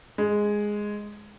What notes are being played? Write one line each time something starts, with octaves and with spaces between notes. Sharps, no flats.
G#3